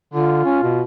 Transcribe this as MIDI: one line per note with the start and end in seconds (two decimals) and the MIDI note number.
0.14 0.44 50
0.14 0.80 65
0.45 0.60 61
0.63 0.82 47